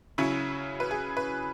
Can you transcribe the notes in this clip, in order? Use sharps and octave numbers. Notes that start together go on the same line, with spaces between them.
C#3 F#3 C#4 E4
B4
G#4
B4